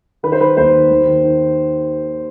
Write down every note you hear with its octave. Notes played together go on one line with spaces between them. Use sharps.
D#3 B4
C5
D#3 B4
D#2 C5
D#3
D#2
D#3
D#3